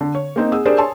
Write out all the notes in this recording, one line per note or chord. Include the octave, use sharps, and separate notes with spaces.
D3
C#5
A#3 C4 D#4
G#4 F#5 D#6 E6
D4 G4 G#4 A#4 C5 D5
C#5 G#5 A5 C6 E6